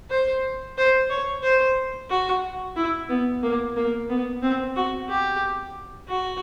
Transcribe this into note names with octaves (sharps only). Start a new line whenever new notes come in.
C5
C5
C#5
C5
F#4
E4
B3
A#3
A#3
B3
C4
F#4
G4
F#4